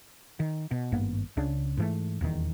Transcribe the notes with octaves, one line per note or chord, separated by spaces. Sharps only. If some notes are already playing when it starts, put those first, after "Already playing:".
D#3
B2
G#1 G2 A#3 B3
C#2 C#3 D4
G#2 E3 A3
D#1 E2 D#3